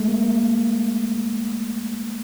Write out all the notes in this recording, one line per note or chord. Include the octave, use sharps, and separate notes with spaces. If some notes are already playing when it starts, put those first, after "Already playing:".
Already playing: G#3 A3
A#3
A#3